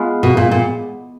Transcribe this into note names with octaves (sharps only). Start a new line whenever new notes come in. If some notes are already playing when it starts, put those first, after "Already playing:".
Already playing: G#3 B3 F4
B2
A#2
A#2